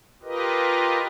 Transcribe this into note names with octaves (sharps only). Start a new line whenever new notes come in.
F4 G4 A#4 B4 D#5